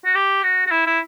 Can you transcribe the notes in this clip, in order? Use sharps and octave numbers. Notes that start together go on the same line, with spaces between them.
F#4
G4
F#4
F#4
E4
E4